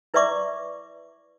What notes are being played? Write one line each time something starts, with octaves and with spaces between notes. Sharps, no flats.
E4 B4 D5 E5 C#6 D6